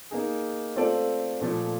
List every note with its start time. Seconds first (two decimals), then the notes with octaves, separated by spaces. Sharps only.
0.11 A#3 D#4 G#4
0.76 A3 C4 F4 A4 D5
1.41 A#2 F3 A3